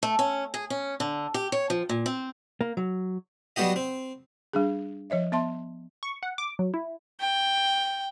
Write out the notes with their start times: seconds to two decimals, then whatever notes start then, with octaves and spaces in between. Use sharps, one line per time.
0.03 A3
0.19 C#4
0.54 G#4
0.70 C#4
1.00 D3
1.34 G4
1.52 C#5
1.70 F3
1.89 A#2
2.06 C4
2.61 A#3
2.77 F#3
3.56 F#3 G3 B3 F#4 G4 D#5
3.76 C4
4.53 G3 D4 G#4
5.10 F3 C#5 D#5 E5
5.32 B3 E5 A5 C6
6.03 C#6
6.23 F#5
6.38 D6
6.59 F#3
6.74 E4
7.20 G5